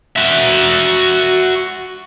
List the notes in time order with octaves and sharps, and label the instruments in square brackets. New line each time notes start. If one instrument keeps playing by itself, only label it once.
[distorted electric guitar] F#4 E5